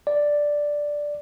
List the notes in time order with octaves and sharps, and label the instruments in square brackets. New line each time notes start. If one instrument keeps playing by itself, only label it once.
[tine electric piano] D5